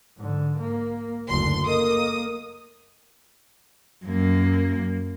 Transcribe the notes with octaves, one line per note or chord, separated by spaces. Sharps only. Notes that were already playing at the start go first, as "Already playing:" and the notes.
G#2 D3
A#3
F#1 D2 C6
A#3 A4 A#4 D#5 D#6
F#2 A#3